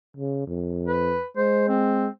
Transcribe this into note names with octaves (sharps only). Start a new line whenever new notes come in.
C#3
F2
B4
G#3 C5
C4